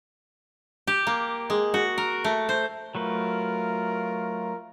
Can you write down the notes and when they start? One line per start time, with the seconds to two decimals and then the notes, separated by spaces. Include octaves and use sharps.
0.87 G4
1.07 A#3
1.50 G#3
1.74 F#4
1.98 A#4
2.24 A3
2.49 C5
2.95 F#3 A3 F4 A#4 B4